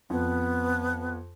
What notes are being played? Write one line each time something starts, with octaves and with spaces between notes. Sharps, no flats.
F2 B3